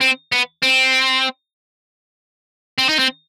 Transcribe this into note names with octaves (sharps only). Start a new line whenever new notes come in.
C4
B3
C4
C4
D#4
C4